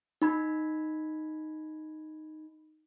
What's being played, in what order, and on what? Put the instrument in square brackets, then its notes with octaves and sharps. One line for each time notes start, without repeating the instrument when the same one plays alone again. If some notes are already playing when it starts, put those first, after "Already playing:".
[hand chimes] D#4 B5 G#6